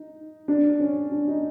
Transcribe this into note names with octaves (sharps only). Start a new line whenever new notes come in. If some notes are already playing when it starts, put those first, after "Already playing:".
Already playing: D#4
D4
C#4
D4
D#4